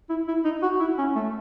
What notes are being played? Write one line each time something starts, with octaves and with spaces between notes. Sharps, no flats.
E4
E4
D#4
F#4
E4
C#4
A3